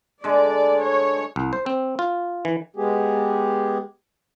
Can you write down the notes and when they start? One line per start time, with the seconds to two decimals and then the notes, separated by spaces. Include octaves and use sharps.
0.24 D3 G#3 D5
0.83 C#5
1.36 C2
1.53 C5
1.66 C4
1.99 F4
2.45 E3
2.76 G#3 B3 G4 G#4